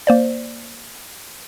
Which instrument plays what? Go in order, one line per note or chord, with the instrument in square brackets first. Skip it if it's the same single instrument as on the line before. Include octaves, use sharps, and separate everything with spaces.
[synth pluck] A#3 C5 D5